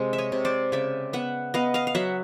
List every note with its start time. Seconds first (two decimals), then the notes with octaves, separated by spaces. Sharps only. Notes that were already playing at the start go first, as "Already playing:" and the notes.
Already playing: C3 G#3
0.13 E5
0.18 C#5 D#5
0.32 C3
0.45 C5 D5
0.72 C#3 D5 E5
1.13 B3 E5 F#5
1.54 B3 D#5 F5
1.74 D#5 F5
1.87 F5
1.95 F#3 E5 F#5